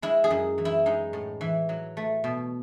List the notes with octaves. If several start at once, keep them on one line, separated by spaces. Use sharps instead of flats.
G#3 E4
G#4
F#2
E3
E4
G#3 D#4
A2
E3
F#3
A3
B2